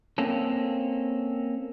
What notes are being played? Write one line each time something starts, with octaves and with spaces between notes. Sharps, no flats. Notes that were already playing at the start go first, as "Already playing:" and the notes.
A#3 C4 C#4 A4